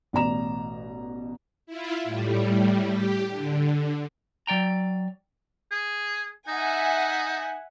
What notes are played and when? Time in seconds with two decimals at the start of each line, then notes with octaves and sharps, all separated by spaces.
0.13 A1 B2 D5 A#5 E7
1.66 E4 F4
2.04 A2 G3
2.88 G4
3.28 D3
4.47 F#3 D5 G5 A#5
5.71 G#4
6.48 D#4 E5 F#5 G#5